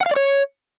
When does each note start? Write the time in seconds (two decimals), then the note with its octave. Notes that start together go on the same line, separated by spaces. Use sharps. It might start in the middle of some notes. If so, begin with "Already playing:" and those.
0.01 F#5
0.06 F5
0.11 D5
0.16 C#5